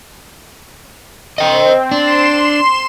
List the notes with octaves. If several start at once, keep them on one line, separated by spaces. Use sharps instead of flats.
C4 D#5 G5
D4 C6 E7